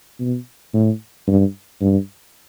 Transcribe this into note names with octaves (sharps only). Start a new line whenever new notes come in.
B2
A2
G2
G2